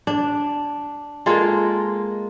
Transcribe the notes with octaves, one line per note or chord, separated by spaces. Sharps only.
D4
G#3 A#3 F4 A4